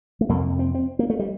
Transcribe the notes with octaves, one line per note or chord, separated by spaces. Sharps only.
A3
F2 C3 A#3
C4
C4
A#3
A3
G3